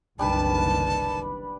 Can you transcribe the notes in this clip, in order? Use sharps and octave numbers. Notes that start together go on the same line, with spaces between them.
F#1 C2 D#3 G3 D4 B4 A5